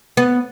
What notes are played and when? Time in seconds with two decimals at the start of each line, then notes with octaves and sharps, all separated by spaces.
0.17 B3